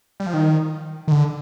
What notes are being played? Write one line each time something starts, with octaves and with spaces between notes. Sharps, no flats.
G3
F3
D#3
D#3
D3